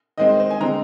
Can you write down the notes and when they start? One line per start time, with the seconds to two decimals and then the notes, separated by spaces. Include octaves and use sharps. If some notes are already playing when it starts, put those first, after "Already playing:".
0.18 D#3 G#3 C4 D#5
0.29 C5
0.40 C5
0.50 G#5
0.61 D3 G#3 C4 A#5